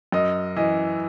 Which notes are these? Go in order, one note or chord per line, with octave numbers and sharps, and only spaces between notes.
F#2 D#5
E3 D#5